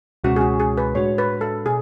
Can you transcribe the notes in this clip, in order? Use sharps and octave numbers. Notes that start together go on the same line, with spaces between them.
C#2 B2 G#3 C#4 F#4
G#4
F#4
G#4
B4
A2 G#3 D4 F#4 C#5
B4
A4
B2 G#4